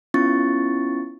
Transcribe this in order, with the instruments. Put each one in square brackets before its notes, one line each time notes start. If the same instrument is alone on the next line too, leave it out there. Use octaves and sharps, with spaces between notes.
[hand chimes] B3 C#4 E4 F4 C#6 A6